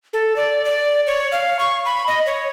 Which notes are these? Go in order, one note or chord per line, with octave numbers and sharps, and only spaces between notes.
A4
D5
D5
C#5
F5
C#6
B5
D#5
C#5